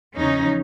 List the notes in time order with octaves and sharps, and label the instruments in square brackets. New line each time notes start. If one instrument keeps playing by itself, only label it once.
[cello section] E2 C#3 F3 C#4 D#4